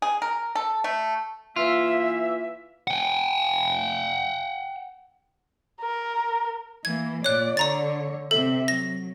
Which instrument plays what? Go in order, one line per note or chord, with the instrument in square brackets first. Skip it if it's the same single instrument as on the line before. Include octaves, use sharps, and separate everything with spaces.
[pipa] G#4
A#4
A4
A3
[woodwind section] E3 A#3 E5 [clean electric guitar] F4
[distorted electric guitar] F#5 G5
[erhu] A#4
[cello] E3 A#3 [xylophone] G#6
[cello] A#2 D5 [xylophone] C#5 F#6
[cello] D3 C#5 [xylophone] D5 A#5 A6
[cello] C3 E5 [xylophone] A4
[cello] F#3 [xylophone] A#6